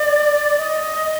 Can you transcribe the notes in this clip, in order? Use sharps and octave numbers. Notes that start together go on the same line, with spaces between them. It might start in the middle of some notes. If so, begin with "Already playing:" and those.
Already playing: D5
D#5